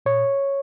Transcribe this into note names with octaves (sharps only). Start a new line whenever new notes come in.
A#2 C#5